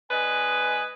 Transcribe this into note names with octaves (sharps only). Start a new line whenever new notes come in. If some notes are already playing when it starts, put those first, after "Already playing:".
G#3 D4 B4 D#5 G#5